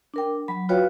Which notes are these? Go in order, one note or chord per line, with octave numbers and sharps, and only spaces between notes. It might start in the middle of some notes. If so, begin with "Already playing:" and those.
D4 A#4 G5
F#3 B5
F4 F#4 B4 C#5 F5 G5